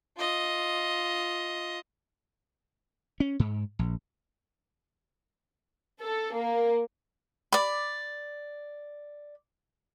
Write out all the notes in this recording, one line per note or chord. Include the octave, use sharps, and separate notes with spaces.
F4 D#5
C#4
G#2
A#1
A4
A#3
D5 B5